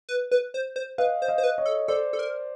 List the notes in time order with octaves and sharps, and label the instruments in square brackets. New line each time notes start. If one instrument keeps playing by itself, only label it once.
[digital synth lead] B4
B4
C5
C5
[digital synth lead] B4 [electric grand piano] D#5 F5
[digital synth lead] C5
[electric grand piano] D#5 F5
[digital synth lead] C5
B4
[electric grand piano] C#5 D#5
[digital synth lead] A4
[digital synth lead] A4 [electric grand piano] C5 D5
[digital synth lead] A4
A#4